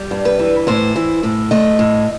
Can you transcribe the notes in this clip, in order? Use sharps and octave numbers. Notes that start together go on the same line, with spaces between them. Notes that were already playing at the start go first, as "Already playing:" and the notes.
Already playing: G3
G2
B4
E3
A2 C5
E3
A2
A3 D#5
A2